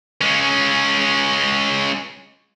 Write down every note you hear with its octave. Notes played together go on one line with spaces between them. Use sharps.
G#3 C#4